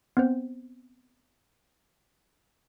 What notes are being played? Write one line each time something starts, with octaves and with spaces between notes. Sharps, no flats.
B3 C4 C5